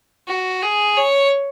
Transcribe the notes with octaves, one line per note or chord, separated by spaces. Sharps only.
F#4
G#4
C#5